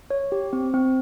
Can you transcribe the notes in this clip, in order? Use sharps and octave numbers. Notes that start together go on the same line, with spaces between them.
C#5
G4
C4
C4